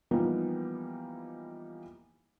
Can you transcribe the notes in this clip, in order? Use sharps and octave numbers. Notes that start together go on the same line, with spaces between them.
E3 F3 G3 A#3 B3 D#4